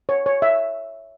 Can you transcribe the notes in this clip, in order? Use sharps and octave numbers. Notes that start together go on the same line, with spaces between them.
C#5
C#5
E5